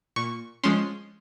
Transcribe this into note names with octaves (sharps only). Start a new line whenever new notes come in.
A#2 C#6
F3 G#3 C#4 C6